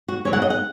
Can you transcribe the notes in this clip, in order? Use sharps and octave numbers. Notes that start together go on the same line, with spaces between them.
F#4
C#3 F#3 A#3 C#4 C#5
F#5
D#5
F#5